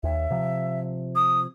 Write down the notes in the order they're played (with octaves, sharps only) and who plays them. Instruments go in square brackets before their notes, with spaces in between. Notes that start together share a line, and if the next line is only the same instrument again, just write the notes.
[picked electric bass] D#2 [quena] E5
[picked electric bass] C3 F3
[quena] D#6